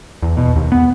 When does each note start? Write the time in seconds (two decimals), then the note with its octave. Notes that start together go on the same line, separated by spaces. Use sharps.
0.22 E2
0.37 B2
0.56 D#2
0.72 B3